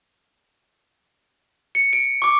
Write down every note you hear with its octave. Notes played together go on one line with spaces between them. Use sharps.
C#7
D7
C#6 D6